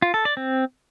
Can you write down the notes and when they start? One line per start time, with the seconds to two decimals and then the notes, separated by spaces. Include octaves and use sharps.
0.02 F4
0.14 A4
0.25 D5
0.37 C4